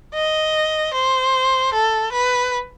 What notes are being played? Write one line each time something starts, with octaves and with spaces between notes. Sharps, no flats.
D#5
C5
A4
B4